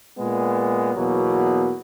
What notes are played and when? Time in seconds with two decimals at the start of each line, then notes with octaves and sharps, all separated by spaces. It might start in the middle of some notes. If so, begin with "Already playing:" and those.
0.17 A#2 G#3 B3
0.95 E2 B2 F#3 A#3